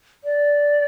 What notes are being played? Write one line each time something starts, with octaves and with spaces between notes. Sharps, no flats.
D5